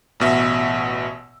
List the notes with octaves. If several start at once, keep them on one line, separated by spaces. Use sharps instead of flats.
A1 B2 E5 E6